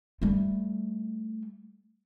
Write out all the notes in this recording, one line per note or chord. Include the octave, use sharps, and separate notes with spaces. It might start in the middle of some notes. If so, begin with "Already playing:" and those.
G3 A3